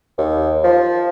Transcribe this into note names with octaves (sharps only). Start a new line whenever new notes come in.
D#2
F3